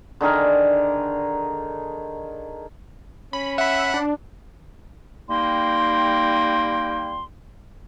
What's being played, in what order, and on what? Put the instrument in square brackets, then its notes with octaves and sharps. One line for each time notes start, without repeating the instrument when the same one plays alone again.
[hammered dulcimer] D3 D#3 G#4 A#4
[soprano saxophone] C#4 [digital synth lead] B5
[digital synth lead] E5 [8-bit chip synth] F#5 B5
[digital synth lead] D4
[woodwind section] G3 A#3 D#4 G5 C6